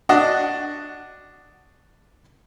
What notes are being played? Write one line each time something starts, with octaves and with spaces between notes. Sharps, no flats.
D4 F#4 D#5 F#5